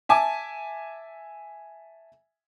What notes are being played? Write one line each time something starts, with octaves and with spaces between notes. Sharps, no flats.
E5 G#5 A5 D6